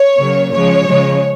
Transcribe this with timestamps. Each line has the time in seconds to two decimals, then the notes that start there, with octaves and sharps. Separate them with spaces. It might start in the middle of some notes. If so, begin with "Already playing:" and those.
Already playing: C#5
0.18 C#3 F#3 A#3
0.52 C#3 F3 G#3 C#5
0.87 C#3 F3 G#3